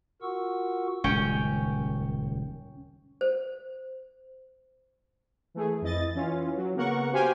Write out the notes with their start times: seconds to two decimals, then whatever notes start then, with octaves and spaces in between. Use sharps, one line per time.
0.22 F4 F#4 A#4 F#5 C#6 E6
1.04 D#1 C#2 F#2 C#4 G5
3.21 C5
5.54 E3 A3 G#4
5.82 F2 E4 D#5 A6
6.15 E3 C#4 F4
6.56 F#3
6.75 C#3 A#3 B3 A#4 F#5 C#6
7.12 F#4 G4 C5 F5 G5 G#5